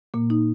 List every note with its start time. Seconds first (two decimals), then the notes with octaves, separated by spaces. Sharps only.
0.14 A#2 A#3
0.30 D#4